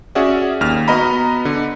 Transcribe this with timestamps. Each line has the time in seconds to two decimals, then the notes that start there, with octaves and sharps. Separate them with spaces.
0.15 C#4 F#4 G#4 D5 E5 F#5
0.61 D#2 F6
0.88 B3 F#4 D#5 A#5 B5
1.45 D3